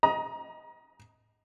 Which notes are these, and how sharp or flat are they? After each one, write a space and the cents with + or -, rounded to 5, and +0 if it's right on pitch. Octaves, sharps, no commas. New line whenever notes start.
D#5 +10 A#5 +30